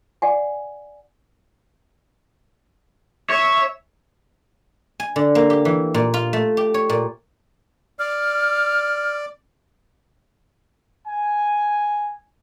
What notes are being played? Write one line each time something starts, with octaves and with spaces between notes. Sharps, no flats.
D5 F#5 G#5
C#5 E5
G#5
D3
A#3
G4
E3
A#2
F4
A3
G4
C#5
A#2
D5 F6
G#5